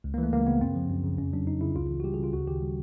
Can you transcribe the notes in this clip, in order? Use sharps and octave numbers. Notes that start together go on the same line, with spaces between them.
C#2
A#3
E3 A3
C#2 A#3
C#3 B3
F#2 C4
F3
F#2
C#3
F2 C#4
F#3 D4
F2 D#4
C#3 E4
C#2 F4
E3
F#4
G3 G4
G#4
C#3 F4
D2 F#4
D#3 G4
G3